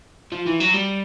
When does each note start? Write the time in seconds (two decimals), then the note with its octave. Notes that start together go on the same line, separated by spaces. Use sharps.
0.32 F3
0.46 E3
0.60 F#3
0.74 G3